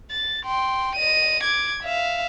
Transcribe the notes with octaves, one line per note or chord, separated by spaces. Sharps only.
A6
G5 C6
D#5 D#7
D6 G#6
E5 F5